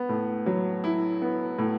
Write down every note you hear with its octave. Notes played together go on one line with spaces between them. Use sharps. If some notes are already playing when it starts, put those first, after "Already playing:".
Already playing: B3
A2
F#3
E4
B3
A2